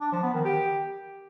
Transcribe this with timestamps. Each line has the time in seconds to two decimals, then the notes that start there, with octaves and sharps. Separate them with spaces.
0.01 D4
0.12 F3
0.23 B3
0.34 D#3
0.45 G4